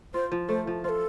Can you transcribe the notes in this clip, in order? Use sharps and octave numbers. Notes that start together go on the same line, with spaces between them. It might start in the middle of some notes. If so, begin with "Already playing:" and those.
F4 C5
F3
A3 C5
F3
F4 A4 C5